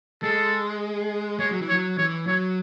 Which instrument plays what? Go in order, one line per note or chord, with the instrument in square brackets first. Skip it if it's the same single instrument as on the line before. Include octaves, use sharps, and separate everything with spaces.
[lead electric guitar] G#3 [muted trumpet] A4
[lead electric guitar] G#3 [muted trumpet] C#5
[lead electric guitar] F#3
E3
[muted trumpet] C#5
[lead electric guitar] F#3
[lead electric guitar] E3 [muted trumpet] C#5
[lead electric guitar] F#3 [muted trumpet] C#5